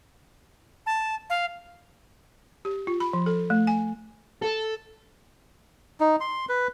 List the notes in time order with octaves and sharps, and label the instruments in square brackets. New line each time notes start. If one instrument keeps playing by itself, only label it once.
[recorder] A5
F5
[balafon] G4
F4
B5
F3
A4
A3
G#5
[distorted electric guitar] A4
[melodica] D#4
C6
B4